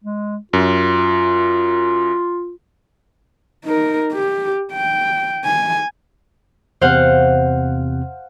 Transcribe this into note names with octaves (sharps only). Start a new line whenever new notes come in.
G#3
F#2 F4
D#4 A#4
G4
G5
G#5
E2 C3 C4 C5 F5 F#5